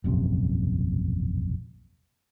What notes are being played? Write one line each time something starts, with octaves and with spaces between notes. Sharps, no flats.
E1 A#1 F#2 C3